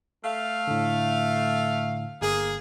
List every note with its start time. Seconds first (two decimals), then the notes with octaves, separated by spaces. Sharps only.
0.24 A3 F5
0.67 A2 D3
2.22 G1 A#3 G#4